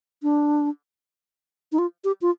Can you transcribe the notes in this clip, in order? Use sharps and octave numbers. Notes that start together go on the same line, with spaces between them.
D4
D#4
F4
G4
F4